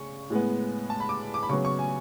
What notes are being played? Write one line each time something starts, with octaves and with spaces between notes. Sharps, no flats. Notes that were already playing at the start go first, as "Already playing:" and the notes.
Already playing: C#3 C#6
A2 G#3 B3
A5
B5
D6
D6
B5
C#3 F#3 B3 C#6
C#6
G#5